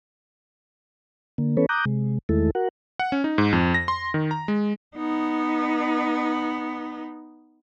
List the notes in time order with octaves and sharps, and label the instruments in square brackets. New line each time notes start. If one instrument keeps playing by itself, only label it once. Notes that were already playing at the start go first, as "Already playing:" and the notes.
[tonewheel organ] D3 A#3
E3 B3 C#4 A4 B4 C#5
A#5 D6 D#6 F#6 G6
C3 G#3
E2 D#3 G#3 A3 E4 A4
F#4 A#4 F#5
[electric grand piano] F#5
C#4
D#4
G#2
F2
A#6
C6
D#3
A#5
G#3
[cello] B3 D#4